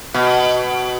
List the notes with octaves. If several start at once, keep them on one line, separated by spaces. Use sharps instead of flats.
B2